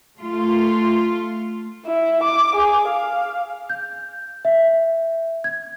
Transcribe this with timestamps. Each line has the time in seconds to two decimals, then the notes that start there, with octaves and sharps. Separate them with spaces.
0.20 A3 F4
1.86 E4
2.23 D6
2.56 G#4
2.88 F5
3.70 G6
4.45 E5
5.44 G#6